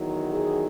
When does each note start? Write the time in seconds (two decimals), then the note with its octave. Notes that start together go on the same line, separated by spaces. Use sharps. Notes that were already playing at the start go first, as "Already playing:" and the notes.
Already playing: E2 D#3 F#3
0.33 G#4